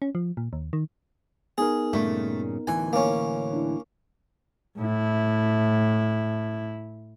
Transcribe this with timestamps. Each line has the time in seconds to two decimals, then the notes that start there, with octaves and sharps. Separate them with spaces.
0.02 C#4
0.15 F3
0.37 A#2
0.53 D#2
0.73 D#3
1.58 B3 D#4 G#4 A#4
1.93 G2 A#2 C#3 A3
2.67 D1 D2 E3 G#5
2.93 A#3 C#4
3.53 D4 E4
4.77 A2 E4